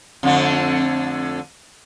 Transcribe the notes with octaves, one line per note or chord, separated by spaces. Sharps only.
F2 D3 A3